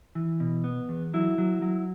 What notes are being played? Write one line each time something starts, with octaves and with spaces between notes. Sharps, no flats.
E3
B2
B3
E2
F#3 E4
F#3
F#3